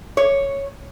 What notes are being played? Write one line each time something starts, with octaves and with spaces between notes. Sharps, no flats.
C#5